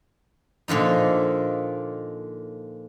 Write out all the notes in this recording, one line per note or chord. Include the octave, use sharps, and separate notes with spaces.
A#2 D3 F3 D#4